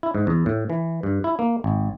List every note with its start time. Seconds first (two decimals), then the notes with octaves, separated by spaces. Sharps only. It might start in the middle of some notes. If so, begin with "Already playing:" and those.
0.03 E4
0.15 G#2
0.27 E2
0.46 A2
0.70 E3
1.03 G2
1.24 E4
1.39 A#3
1.64 G#1